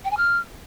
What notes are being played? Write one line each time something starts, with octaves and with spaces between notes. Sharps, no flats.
G5
G#5
F6